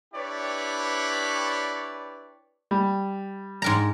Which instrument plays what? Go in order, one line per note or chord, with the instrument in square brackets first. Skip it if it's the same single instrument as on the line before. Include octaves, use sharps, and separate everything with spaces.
[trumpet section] D4 E4 G4 B4 C#5 D5
[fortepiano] G3
[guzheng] G#2 A#4 A#5